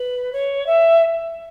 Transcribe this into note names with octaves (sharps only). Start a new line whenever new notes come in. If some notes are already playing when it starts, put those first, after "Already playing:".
Already playing: B4
C#5
E5